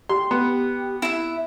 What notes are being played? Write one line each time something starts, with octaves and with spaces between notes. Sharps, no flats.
G4 C6
B3
E4 E5